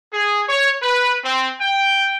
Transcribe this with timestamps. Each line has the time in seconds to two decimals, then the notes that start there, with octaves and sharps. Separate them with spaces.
0.12 G#4
0.48 C#5
0.82 B4
1.23 C4
1.60 G5